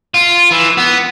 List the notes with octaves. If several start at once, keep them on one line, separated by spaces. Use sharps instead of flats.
F4
E3
B3